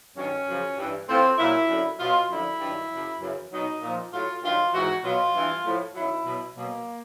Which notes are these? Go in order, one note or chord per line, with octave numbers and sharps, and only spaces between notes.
G2 D#3 F#3 C#4
F#2 C#3 F3
G2 E3
A2 F3 C4
A#2 F#3 E4
F#2 D3 F#3
B2 F#3 F4
F#2 D3 F3 E4
G2 D#3 F#3
F#2 C#3 F#3
F#2 C#3 E3
B2 F#3 D#4
A#2 F3
A2 F#3 F4
G2 D#3 F#3 F4
G#2 E3 F#4
B2 F#3 F4
G2 E3
A2 F3
F#2 D#3 F#3 E4
B2 F#3
B2 F#3 A#3